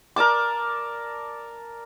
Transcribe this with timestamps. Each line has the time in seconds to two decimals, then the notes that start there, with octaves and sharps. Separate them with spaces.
0.16 A#4 D5 A5 D6